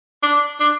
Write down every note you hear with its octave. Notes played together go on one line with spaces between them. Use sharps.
D4
D4